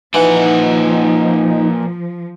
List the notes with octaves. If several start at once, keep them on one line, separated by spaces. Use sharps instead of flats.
A#2 E3 F3 D#4 F#5